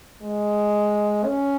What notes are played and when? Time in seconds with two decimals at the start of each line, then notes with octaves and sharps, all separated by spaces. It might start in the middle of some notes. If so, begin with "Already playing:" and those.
0.23 G#3
1.25 C#4